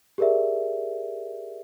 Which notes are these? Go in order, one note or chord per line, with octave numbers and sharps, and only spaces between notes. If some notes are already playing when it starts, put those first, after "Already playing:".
G4 G#4 A#4 D5 E5